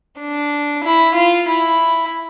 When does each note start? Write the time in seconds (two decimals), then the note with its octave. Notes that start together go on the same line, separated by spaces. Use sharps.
0.18 D4
0.82 E4
1.15 F4
1.48 E4